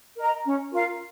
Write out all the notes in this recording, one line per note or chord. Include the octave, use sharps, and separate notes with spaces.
A#4 D#5 A#5
C#4
F4 A#4 F5